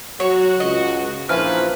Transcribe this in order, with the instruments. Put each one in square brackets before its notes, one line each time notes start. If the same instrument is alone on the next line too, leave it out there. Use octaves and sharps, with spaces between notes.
[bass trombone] F#3 [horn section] F#4 [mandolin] C#5
[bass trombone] C#2 [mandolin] D#5
[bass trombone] A#1 [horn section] F#2 A#4 B4 [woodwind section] E3 F3 [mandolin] F6